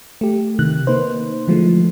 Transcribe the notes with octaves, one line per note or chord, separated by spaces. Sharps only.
A3 G4
C3 D#3 F#6
A#3 D#4 B4 C5
D3 E3 F3 G#3 A3